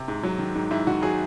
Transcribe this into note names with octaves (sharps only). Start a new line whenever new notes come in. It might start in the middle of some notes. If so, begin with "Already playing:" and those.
Already playing: C3
G#2
F#3
D#3
G#2
G#2 E4
D#3 F#4
F#3 G#4